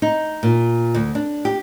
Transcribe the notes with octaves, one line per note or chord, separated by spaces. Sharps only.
D#4
A#2
D2
D4
G4